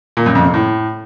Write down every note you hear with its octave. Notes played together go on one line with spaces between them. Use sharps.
A#2
F#2
F2
C3
A2